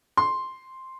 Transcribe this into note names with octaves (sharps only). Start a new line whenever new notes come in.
C6